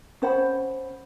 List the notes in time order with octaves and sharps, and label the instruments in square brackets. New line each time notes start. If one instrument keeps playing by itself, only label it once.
[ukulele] C#4 C5 F#5 B5